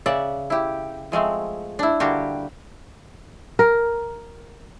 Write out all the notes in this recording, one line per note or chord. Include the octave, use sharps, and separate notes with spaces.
C#3 D5 E5 F#5
E4 G4
F3 G#3 A3 C4
D4 E4
D3 G3 A#3 F#4 G4
A#4